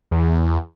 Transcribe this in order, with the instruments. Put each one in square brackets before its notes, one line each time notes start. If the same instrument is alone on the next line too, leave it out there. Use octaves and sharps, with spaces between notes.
[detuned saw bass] E2